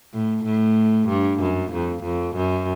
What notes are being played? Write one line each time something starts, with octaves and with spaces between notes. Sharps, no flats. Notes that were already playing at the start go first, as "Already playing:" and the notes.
A2
A2
G2
F#2
F2
F2
F#2